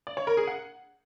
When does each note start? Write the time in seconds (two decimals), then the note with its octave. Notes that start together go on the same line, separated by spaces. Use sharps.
0.07 D5
0.17 C#5
0.27 A#4
0.37 G#4
0.47 F#5